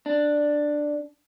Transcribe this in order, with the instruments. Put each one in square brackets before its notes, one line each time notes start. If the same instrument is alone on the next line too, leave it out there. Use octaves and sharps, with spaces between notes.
[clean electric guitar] D4